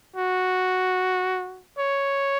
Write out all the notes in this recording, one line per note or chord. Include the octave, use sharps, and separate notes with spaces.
F#4
C#5